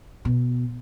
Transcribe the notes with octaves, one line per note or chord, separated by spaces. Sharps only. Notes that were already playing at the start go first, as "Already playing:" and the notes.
B2